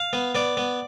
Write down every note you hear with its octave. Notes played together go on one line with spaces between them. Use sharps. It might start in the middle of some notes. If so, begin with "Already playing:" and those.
Already playing: F5
B3
B3 D5
B3